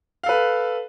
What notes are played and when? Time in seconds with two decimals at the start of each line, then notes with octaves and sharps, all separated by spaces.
0.23 F5
0.26 A4
0.29 B4